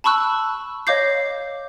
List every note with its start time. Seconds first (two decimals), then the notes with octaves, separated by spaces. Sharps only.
0.04 A5 B5 C#6 E6 F#6
0.87 C#5 D#5 F5 D6 G6 C7